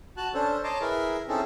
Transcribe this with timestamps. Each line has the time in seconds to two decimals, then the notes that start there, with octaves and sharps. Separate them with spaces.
0.17 F#4 A5 F#6
0.34 C#4 D4 A4 C5
0.64 C#5 D#5 A5 A#5 C6 D6
0.81 E4 G#4 A#4 B4
1.28 C4 C#4 D#4 E4 G#4 A4